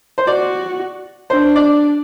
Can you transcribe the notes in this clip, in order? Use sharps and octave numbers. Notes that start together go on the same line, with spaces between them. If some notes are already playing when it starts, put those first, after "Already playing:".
C5
F#4 D5
D4 C5
D5